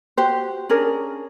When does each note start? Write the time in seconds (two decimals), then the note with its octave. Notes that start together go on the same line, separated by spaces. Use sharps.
0.17 F#4 G4 C5
0.69 C#4 D4 G#4 A#4